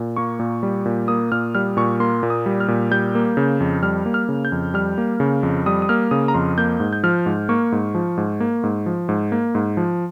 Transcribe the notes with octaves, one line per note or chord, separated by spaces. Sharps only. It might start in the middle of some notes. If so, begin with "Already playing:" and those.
Already playing: A#2
A#3 C#6
A#2
G3
A#2
A#3 D#6
A#2 F6
G3 F6
A#2 C#6
A#3 C6
A#2
D#6
G3
F6
A#2
G3 G6
A#3
C#3
F2
G3 F6
A#3
F6
C#3
G6
F2
G3 F6
A#3
C#3
F2
G3 D#6
D#6
A#3 F6
C#3 D#6
A#5
F2 C6
A#3 G6
G#2
G6
F3 F6
G#2
A#3 C#6
G#2
F3
G#2
A#3
G#2
F3
G#2
A#3
G#2
F3